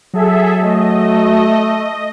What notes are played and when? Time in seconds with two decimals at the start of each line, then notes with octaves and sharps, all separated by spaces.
0.13 F#3 G#4 A4 E5
0.62 A3 D#5